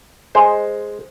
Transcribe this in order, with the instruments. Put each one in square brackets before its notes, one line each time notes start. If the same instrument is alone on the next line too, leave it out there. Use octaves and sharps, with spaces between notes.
[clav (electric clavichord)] G#3 C5